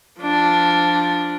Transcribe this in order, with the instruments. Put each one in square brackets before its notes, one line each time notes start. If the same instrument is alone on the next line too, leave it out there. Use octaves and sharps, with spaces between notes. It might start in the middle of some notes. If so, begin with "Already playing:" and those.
[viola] F3 D4